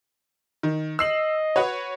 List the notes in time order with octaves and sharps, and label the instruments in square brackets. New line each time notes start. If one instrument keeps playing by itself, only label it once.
[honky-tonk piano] D#3
[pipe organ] D#5 [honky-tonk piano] E6 C7 F#7
[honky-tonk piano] F#4 B4 C#5